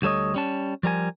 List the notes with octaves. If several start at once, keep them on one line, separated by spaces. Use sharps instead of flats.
D2 G3 A4 C#5 D#5
G3 C#4 A5
F3 G3 A#4 G#5